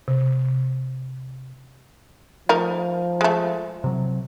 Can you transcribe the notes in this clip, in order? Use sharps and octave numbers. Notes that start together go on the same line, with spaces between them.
C3
F3 A3 D#4 A#4
G#3 A3
C3 F#3